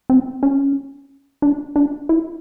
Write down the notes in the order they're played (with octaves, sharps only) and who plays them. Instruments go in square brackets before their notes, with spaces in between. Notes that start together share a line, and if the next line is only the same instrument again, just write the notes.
[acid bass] C4
C#4
D4
D4
E4